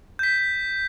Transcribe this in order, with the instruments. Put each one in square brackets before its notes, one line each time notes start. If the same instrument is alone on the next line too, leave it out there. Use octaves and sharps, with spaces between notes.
[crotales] G6 B6